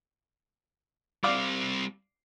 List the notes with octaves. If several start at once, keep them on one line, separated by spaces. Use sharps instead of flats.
G3 C4 D5 F5 D6